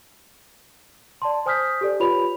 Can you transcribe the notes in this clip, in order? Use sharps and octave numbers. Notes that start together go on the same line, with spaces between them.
D5 A5 C6
C5 G#5 D#6 F6 G6 B6
G4 A4 D5
F4 G4 B4 C#5 B5 F7